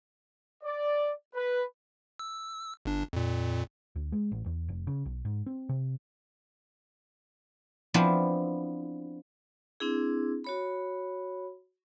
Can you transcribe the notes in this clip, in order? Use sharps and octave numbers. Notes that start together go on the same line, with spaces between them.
D5
B4
E6
G1 D4
F2 A#2
D2
G#3
A1
E2
F1
C#3
B1
G#2
C4
C3
F3 B3 C4 D4 E4
C4 D4 E4 G#4
F#4 C#5 B5